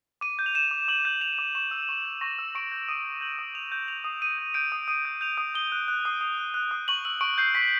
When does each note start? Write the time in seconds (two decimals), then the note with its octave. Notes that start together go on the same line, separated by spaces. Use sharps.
0.21 D6 D#7
0.39 G6
0.46 F7
0.55 G6 E7
0.71 D6
0.88 D6 F#7
1.05 G6
1.21 G6 F7
1.39 D6
1.55 C#6 E7
1.71 E6
1.89 C#6
2.05 G6
2.21 C#6 A#6
2.38 E6
2.55 C#6 D7
2.72 G6
2.88 D#6 D#7
3.05 G6
3.21 G6 F#7
3.39 D#6
3.54 D#6 F7
3.72 G6
3.88 G6 F7
4.04 D#6
4.22 D#6 D#7
4.39 G6
4.54 G6 D7
4.72 D#6
4.88 D#6 D#7
5.05 G6
5.21 G6 F7
5.38 D#6
5.55 D#6 G7
5.72 F#6
5.88 F#6
6.05 D#6
6.21 D#6
6.38 F#6
6.54 F#6
6.71 D#6
6.88 C#6 F#7
7.05 E6 F#7
7.21 C#6 D7
7.38 G6 C7
7.55 C#6 B6